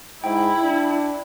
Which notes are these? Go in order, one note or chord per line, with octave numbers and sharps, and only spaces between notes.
G#2 E4 G5
D4